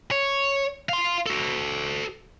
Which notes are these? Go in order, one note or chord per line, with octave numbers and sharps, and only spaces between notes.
C#5
F5 C6
F#4 A4